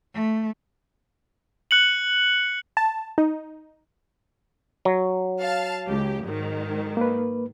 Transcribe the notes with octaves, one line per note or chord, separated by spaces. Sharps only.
A3
F#6 C#7 F#7
A5
D#4
F#3
F5 A5
C#2 G4
G#2 D#3
A#3 B4